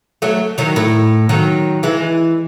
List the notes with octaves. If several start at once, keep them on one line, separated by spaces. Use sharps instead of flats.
F#3 A3
D#3 F#3
A2
D#3 F#3
E3 G#3